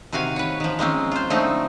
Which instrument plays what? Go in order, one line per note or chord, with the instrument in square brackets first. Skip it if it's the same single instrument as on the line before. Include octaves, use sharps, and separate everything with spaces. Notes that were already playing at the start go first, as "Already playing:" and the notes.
[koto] C3 D#3 F#4 F5 G#5
B4 C#5
D#3 F3
G#3 A#3 C4 C#4
F4 C5
D3 F3 A3 C4 C#4 D#4